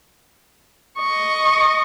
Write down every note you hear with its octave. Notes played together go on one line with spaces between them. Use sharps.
D#5 C#6